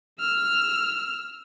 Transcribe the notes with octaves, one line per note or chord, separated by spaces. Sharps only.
E6 F6